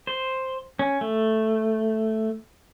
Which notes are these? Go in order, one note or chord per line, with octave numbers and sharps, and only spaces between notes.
C5
C#4
A3